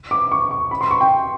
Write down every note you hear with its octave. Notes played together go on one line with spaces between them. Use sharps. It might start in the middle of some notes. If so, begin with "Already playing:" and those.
D6
C#6
C#6
B5
C6
C#6
G5